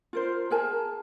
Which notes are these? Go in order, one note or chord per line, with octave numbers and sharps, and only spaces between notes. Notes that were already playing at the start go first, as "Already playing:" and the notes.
F4 A#4 C5
G#4 A#4 G#5 A5